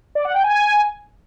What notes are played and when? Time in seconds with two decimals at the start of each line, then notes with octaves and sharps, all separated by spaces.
0.15 D5
0.25 F#5
0.34 G5
0.44 G#5